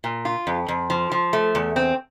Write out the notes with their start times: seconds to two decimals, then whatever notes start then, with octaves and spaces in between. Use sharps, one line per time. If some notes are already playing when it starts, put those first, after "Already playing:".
0.04 A#2
0.25 F4
0.47 F2
0.68 F2
0.90 F3
1.12 F3
1.33 A3
1.55 E2
1.76 C4